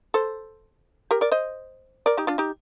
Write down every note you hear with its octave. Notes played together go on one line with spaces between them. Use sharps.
A4 C5
G4 A#4
A#4 D5
C5 D#5
A#4 D5
D#4 G4
D4 F4
D#4 G4